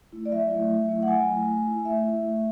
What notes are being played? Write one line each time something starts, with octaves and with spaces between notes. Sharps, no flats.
A3 E4
D5
F#3 E5
A3 E4
F#3
A3 E4
F#5
F#3 G#5
A3 E4
A3
E4
A3 E5
E4
A3